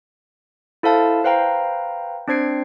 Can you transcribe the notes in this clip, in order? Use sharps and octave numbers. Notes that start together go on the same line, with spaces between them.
E4 A4 C5 F5 A5
B4 C5 F5 G5 A#5
C4 D4 C5 G#6 C7 D7